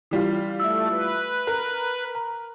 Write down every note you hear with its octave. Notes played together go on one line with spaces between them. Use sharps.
E3 G3 F4
A3 E5 E6
B4
A#4 A#5
A#5